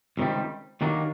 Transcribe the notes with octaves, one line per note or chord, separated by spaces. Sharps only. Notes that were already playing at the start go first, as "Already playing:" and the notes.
C#2 C3 D#3 G3
D#2 D#3 F#3 A#3 D4